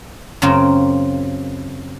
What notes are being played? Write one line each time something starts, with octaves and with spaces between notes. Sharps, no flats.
F#2 C#3 A#3 C4 F4